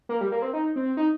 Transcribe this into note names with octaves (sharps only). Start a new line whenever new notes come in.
A#3
G3
A#3
C4
D#4
C4
D#4